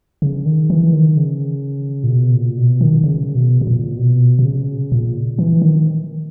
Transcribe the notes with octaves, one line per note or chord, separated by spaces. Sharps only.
C#3
D#3
E3
D#3
C#3
A#2
B2
A#2
B2
D#3
C#3
B2
B2
A#2
B2
B2
C#3
A#2
E3
D#3